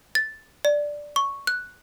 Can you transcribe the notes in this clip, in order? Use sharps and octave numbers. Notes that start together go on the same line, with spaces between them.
A6
D5
C#6
F#6